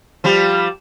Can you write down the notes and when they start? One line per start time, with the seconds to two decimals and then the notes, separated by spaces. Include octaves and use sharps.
0.24 F3 G3